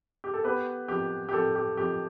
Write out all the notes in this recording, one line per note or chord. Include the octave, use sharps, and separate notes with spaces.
G4
A4
B3 G4 B4
F2 G4
G4
F2 A4
G4
F2 G4